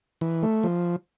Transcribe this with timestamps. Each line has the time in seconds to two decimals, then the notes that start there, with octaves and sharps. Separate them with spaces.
0.21 E3
0.43 A3
0.63 F3